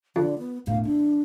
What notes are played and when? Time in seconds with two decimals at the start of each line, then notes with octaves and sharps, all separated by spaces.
0.16 F2 D3
0.39 B3
0.67 E1 A2 F5
0.85 E3 D4